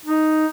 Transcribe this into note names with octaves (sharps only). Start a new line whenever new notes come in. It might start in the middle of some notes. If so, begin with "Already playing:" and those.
D#4